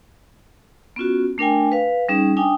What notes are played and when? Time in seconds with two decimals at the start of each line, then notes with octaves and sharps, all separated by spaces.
0.96 B3 C#4 F4 F#4
1.38 A3 D4 A#4 G5 G#5
1.72 B4 F5
2.09 G3 C#4 D#4 G#4
2.37 D4 G5 G#5 D#6